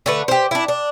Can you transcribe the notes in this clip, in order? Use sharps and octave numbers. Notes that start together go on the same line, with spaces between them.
D3 A3 B4
G4 C5
D4 E4
D4